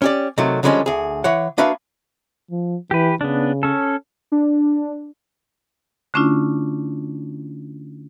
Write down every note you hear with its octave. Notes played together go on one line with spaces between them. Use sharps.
C#4 G4 D5
C3 D#3 F#3 A3
D3 F3 G3 G#3 C4 C#4
D2 G#4
E3 C#5 F#5
A#3 D4 F#4 B4 E5 F5
F3
E3 G4 B4
C#3 B3 D4
C#4 A4
D4
D3 A3 C#4 D4 E4 F4